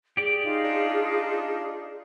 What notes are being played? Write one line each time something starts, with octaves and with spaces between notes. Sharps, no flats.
G4 G#4 D5
D#4 F4
D4